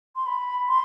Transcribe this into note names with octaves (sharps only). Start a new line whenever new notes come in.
C6
B5
C6